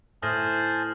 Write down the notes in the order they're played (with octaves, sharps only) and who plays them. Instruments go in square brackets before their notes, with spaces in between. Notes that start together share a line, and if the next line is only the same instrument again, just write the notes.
[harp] A2 [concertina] C5 G#5 A5 [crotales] D#6 F6 A#6